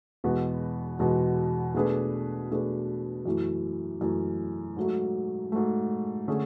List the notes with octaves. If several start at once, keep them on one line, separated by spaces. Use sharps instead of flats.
E2 B2 G#3 B3 F#4
E2 B2 G#3 B3 F#4
B2 A3 D4 G#4 B4
B2 A3 D4 G#4 B4
F#2 E3 A3
F#2 E3 A3
G#2 F#3 A3
G#2 F#3 A3
D3 A3 C#4 G#4